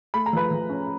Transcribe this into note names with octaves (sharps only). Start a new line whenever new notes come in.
A3 B5
A#5
F3 B4 B5
F3
C#4